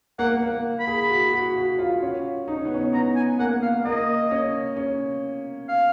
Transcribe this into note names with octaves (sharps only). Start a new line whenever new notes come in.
A#3 F#5
A#3
B5
G#4
F#4
F#4
F#4
F4
C#4
D#4
C#4
B3
C#4
B3 A#5
G#5
A#3 F#5
F5
A#3 D#5
C#4
C#4
F5